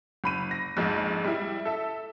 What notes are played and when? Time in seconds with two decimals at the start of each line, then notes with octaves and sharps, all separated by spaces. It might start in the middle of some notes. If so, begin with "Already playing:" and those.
0.24 F#1 B5 D#7
0.51 A#6
0.77 A#1 F2 G#2
1.24 G3 E4
1.65 A4 E5